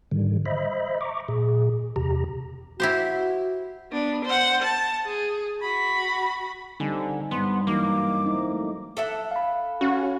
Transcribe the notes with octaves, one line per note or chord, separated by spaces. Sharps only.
G#2 D3 D#3 G3
C5 D#5 E5 B5
A#5 C#6 D6
A#2 G#4
E2 C3 G4 A#5
E4 F#4 G4 C5
B3 D4
C5 F#5
A5
G#4
F#4 B5
D3 G3 C4 D#4 G#5
E2 G2 B3 C6
E3 F#3 A#3 D#4 D6
C4 D#4 E4
A3
A4 E5 F#5
F5 B5
C#4 F#4